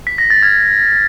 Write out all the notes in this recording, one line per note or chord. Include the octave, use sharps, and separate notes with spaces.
B6
A#6
A6
F6 G#6